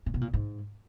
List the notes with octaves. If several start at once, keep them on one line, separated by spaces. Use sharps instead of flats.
A#2
B2
A#2
G#2